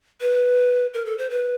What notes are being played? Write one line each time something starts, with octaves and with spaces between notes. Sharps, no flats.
B4
A#4
A4
C5
B4